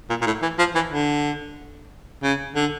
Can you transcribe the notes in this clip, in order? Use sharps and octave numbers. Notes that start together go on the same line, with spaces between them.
A#2
A#2
A2
E3
F3
E3
D3
C#3
D3